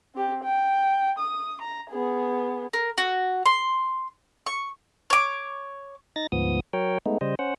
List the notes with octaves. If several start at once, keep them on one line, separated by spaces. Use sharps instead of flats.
C4 G4
G5
D#6
A#5
B3 G#4
A#4
F#4
C6
C#6
C#5 D6
D#4 A6 A#6
D2 G#2 F3 B3 D#6
F#3 A#4 C#5 G5
G#3 A3 B3 D#4
C#3 G3 C5 D#5
C#4 C5 F#5